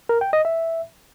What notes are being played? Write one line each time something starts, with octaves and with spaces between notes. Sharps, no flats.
A#4
G5
D#5
E5